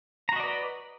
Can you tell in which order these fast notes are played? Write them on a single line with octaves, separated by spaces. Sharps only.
A#5 F#4 D#5 D5 B4